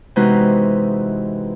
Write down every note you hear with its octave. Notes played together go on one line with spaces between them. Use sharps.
C3 E3 G#3 B3 D#4 F#4